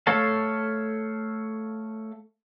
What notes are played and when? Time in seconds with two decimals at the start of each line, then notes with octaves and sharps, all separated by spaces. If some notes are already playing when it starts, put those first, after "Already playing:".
0.07 A3 A4 C#5 F5 A5